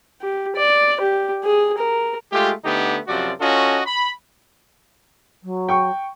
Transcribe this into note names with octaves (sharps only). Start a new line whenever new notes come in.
G4
D5
G4
G#4
A#4
G#3 A3 F4 G4
D3 A3 B3 D#4 G4
F#2 C3 F3 F#4 D5
C#4 F4 F#4 A4 D#5
B5
F#3
G5 C#6